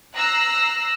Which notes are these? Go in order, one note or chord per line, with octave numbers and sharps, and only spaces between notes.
A#5 E6 F#6 A#6 C7